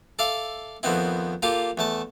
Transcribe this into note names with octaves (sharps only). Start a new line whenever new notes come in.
A4 D5 E5 F5
F2 D#3 B3 C4 E4
A#3 F4 G4 A4
E2 A3 A5